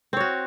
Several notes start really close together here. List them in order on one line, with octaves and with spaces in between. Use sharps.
C4 C#5 F#4